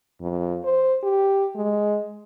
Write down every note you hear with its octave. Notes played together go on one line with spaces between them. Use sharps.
F2
C5
G4
G#3